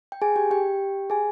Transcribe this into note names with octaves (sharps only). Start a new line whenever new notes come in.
G5
G#4 G#5
G4 G5
G4 G5
G#4 G#5